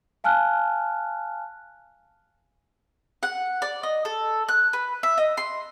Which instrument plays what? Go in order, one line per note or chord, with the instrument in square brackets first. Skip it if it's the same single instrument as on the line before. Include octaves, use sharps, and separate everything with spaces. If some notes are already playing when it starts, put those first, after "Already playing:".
[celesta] F5 G#5 A5 F6 F#6
[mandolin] F#5
D5
D#5
A4
F#6
B4
E5
D#5
C6